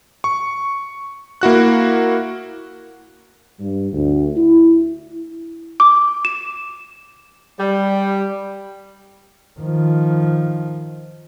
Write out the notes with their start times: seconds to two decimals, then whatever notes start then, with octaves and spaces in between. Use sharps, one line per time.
0.24 C#6
1.41 A#3 E4 F#4 F#6
3.59 G2
3.92 D2
4.37 E4
5.80 D6
6.25 E7
7.60 G3
9.60 D#3 F3